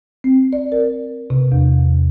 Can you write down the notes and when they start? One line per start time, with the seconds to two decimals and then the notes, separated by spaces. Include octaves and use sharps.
0.24 C4
0.53 D5
0.72 A#4
1.30 C3
1.52 E2